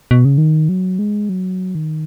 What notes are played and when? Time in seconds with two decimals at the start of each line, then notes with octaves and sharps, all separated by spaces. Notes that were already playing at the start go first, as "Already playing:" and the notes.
0.11 B2
0.25 C#3
0.38 D#3
0.69 F#3
0.99 G#3
1.29 F#3
1.75 D#3